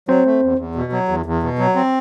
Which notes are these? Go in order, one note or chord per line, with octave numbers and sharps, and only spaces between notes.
F#3 C4 C5
A3
E2
E2
B2
F#3
E2
E2
B2
F#3
C4